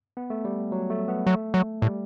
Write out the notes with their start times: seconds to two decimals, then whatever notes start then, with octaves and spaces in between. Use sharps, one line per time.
0.17 B3
0.30 A3
0.45 G3
0.72 F#3
0.90 A3
1.08 B3
1.27 F#3 A3
1.54 F#3
1.82 A2 G3